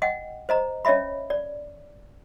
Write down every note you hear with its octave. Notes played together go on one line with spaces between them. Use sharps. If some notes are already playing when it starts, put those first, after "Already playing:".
D#5 F#5 G5
C5 D#5 A#5
C#4 C#5 D#5 E5 B5
D5